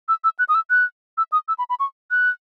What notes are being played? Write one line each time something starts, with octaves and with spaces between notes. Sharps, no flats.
E6
E6
F#6
D#6
E6
F#6
E6
D#6
E6
B5
B5
C#6
F#6